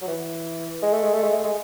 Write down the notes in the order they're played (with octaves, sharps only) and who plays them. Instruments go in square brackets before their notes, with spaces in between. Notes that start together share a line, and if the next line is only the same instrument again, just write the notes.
[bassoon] F#3
E3
G#3
A3
G#3
A3
G#3
A3
G#3